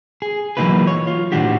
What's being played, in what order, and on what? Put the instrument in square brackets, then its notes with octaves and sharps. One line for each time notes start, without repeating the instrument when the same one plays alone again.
[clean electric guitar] G#4
E3 F#3 A#3 D#4 F4 B4
C#5
F4
A2 D#3 E3 D4 F#4 G4